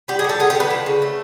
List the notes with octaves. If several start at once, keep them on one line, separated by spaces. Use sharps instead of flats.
G3 G4
G#4
D3
A4
B3 G#4
G4
D3 B4
F3
C#3
A3